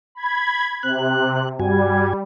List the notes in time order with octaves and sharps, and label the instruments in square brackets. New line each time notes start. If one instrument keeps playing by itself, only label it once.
[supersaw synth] B5 G#6
[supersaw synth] C3 [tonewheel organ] F#6
[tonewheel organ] G2 F#4 G#5 [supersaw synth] G3